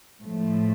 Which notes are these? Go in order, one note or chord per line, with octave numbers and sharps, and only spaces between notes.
A2 F3 A3